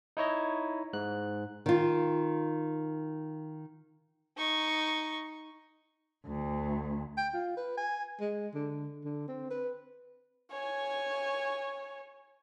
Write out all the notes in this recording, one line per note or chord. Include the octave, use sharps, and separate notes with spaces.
D#4 E4 C#5 D#5
G#2 F#6
D#3 F4
D#4 C#6
D2
G5
F4
B4
G#5
G#3
D3
D3
C4
B4
C#5 G#5